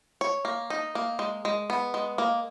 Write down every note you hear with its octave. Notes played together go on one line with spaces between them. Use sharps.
C#5
A#3
D#4
A#3
G#3
G#3
B3
G#3
A#3